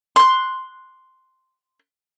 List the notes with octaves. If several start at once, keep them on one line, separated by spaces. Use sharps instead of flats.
C6 F#6